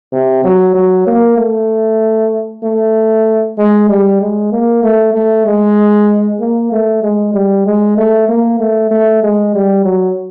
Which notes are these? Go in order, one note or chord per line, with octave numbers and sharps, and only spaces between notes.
C3
F#3
F#3
A#3
A3
A3
G#3
G3
G#3
A#3
A3
A3
G#3
A#3
A3
G#3
G3
G#3
A3
A#3
A3
A3
G#3
G3
F#3